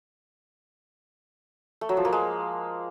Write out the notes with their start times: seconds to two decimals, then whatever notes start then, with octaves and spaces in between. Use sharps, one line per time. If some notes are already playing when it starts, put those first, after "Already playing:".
1.81 A3
1.89 F#3
1.97 F3
2.05 A#3
2.13 G#3